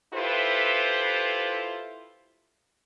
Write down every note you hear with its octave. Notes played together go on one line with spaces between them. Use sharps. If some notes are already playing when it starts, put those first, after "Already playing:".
E4 F4 G4 A4 B4 C5